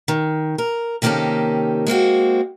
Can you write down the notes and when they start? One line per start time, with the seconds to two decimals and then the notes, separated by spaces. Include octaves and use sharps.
0.08 D#3
0.58 A#4
1.02 C3 D#3 A#3 C#4 G4 A4
1.87 G#3 A#3 C4 F#4